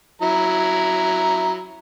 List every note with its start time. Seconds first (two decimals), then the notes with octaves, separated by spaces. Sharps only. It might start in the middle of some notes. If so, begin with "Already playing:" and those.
0.22 F#3 E4 A#5